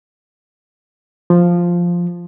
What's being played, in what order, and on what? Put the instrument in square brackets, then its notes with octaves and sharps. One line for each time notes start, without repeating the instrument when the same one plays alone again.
[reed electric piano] F3